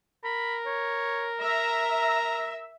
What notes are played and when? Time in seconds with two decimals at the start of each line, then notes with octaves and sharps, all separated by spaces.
0.24 A#4 B5
0.66 C#5
1.41 E5 A#5